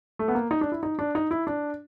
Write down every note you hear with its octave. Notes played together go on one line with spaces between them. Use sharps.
A3
B3
A#3
D#4
D4
E4
D#4
D4
D#4
E4
D4